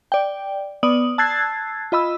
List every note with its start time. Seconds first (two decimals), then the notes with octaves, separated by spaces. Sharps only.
0.12 D5 G5
0.83 B3 D5 D#6 F#7
1.18 A5 E6 F#6 G#6 A6 C7
1.92 F4 D#5 B5 E6